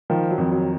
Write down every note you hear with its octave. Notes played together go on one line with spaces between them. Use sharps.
D#3 F3
F#3
F2
F#3